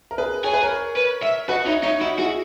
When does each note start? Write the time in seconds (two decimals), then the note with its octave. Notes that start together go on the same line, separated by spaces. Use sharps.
0.11 A#4
0.18 G#4 B4
0.44 G#4 C#5
0.53 B4
0.63 A#4 C#5
0.96 B4
1.23 E5
1.49 F#4 B4 D#5
1.66 D#4 C#5 E5
1.83 D#4 C#5 E5
2.01 D#4 E4 F#4
2.18 E4 F#4 G#4